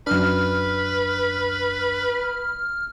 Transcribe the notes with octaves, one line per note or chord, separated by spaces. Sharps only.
F#2 D4 B4 F6